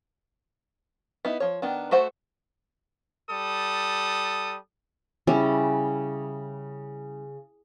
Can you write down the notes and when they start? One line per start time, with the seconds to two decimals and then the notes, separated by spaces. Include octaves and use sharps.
1.25 B3 D#4 E4
1.40 F3 C#5
1.62 D#3 B3 D4
1.91 A3 F#4 C5 F#5
3.30 G3 A4 D#6
5.27 C#3 G3 C#4 E4